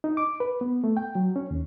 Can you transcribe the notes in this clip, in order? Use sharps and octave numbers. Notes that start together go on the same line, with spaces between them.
D#4
D6
B4
B3
A3
G5
F#3
C#4
D#2